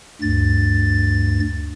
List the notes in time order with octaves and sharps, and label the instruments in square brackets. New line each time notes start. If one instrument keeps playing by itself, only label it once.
[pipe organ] D2 G2 A6